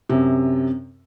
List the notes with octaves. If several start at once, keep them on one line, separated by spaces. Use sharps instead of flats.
F#2 C3